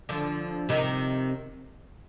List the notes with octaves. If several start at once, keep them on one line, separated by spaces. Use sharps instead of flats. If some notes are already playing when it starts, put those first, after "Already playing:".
D3 F3
C3 D#3